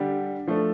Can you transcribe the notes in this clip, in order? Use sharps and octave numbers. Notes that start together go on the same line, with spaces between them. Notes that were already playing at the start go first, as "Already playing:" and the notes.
Already playing: D3 G3 D4 G4 D5
F3 A3 D4 A4